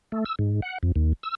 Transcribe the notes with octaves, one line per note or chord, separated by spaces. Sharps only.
A3
E6
G#2
F#5
F2
D#2
E6